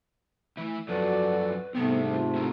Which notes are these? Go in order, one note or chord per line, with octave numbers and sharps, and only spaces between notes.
E3 A3 E4
F#2 F3 F#3 F#4 A4 B4 D5
G#2 C3 G3 A3 B3 C4
F4
C4 E4 A#4